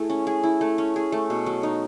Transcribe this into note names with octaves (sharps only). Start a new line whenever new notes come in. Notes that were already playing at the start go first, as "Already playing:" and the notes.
Already playing: A3 E4 G#4
C#4
G#4
E4
A3
C#4
G#4
A3
B2
F#3
D#4